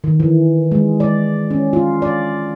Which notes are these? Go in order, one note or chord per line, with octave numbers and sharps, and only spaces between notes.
D#3
E3
G#3
D5
C#4
F4
D5